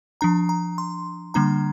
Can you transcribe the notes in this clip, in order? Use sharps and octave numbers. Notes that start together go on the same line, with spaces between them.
F3 D4 A#5
A#5
C6
D3 G3 A#3 D4 A#5